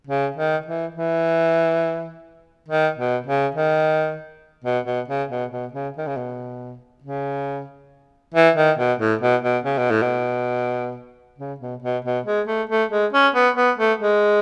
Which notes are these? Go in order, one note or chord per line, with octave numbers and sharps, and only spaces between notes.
C#3
D#3
E3
E3
D#3
B2
C#3
D#3
B2
B2
C#3
B2
B2
C#3
D#3
C#3
B2
C#3
E3
D#3
B2
A2
B2
B2
C#3
B2
A2
B2
C#3
B2
B2
B2
G#3
A3
A3
G#3
C#4
B3
B3
A3
G#3